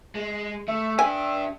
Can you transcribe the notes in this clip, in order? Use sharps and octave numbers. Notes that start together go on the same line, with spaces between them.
G#3
A3 E5
D4 G4 G#5